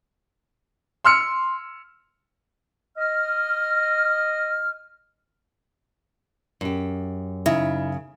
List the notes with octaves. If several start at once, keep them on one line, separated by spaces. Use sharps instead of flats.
C6 E6 F6 C#7
D#5 F6
F#2 G4
C#3 D#4 E4 E5